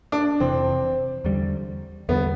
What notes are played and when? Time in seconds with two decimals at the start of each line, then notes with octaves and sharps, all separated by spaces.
0.12 D4
0.40 F1 F2 C3 E3 C4
1.24 E2 D3 G3
2.09 E2 D3 G3 B3